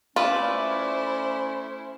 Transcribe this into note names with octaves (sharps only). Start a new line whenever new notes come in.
A3 C#4 E4 F4 B4 C5 D5 E5